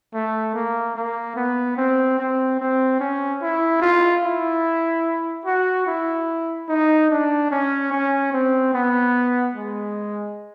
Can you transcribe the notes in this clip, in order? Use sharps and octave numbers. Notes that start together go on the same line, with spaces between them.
A3
A#3
A#3
B3
C4
C4
C4
C#4
E4
F4
E4
F#4
E4
D#4
D4
C#4
C#4
C4
B3
G#3